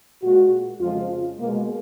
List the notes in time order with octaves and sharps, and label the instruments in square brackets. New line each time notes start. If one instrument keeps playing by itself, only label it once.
[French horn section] A#2 G#3 F#4
F2 C#3 F3 G#3 F4
B2 G#3 A#3